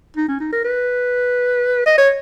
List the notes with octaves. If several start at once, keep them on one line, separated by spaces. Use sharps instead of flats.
D#4
C#4
D#4
A#4
B4
D#5
C#5